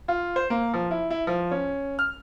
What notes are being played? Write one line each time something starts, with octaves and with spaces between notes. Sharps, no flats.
F4
C5
A#3
F3
E4
E4
F3
C#4
F6